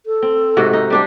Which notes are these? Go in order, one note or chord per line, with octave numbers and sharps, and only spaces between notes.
A4
C4
G#2 C3 F#4
D#4
G3 D4 G4